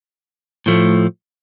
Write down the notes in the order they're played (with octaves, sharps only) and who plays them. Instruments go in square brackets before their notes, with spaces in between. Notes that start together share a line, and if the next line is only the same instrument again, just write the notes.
[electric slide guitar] A2 F3 A3